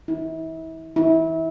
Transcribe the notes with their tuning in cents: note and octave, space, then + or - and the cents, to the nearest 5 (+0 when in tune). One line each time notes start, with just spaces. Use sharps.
E4 -35
E4 -25